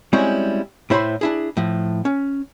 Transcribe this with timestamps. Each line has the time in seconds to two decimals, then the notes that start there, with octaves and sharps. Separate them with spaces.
0.13 G3 G#3 C4 C#4 E4 F#4
0.90 A2 E4 C5 C#5 B5 C6
1.21 D4 E4 G#4
1.57 A2 F3
2.05 C#4